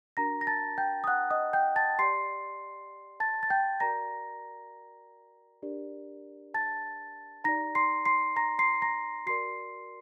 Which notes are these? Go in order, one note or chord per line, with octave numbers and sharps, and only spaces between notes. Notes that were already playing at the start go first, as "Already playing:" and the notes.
D4 F#4 A#4 A#5 A#6
A#6
A5 A6
G5 G6
D#6
F#5 F#6
D#5 D#6
G5 G6
A5 A6
G4 D5 C6 C7
A5 A6
A6
G5 G6
F#4 A#4 D5 A#5 A#6
D4 G4 A#4 D5
A5 A6
D#4 G4 D5 A#5 A#6
C6 C7
C6 C7
A#5 A#6
C6 C7
A#5 A#6
F#4 A#4 D5 C6 C7